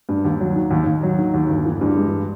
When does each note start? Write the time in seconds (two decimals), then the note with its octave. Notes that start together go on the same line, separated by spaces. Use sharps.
0.09 G2
0.25 D#2
0.41 F#3
0.56 D#3
0.71 D#2
0.87 D#2
1.03 F#3
1.19 D#3
1.34 D#2
1.50 G1
1.66 E3
1.81 G2
1.97 G#3